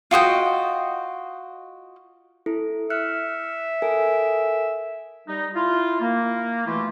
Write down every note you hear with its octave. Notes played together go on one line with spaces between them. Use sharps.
F4 F#4 D#5 G5
E4 A4
E5 F6 F#6 C#7
A4 A#4 G#5
G3 D#4
E4 F4
A#3
B2 E3 A3 E4 F4 G4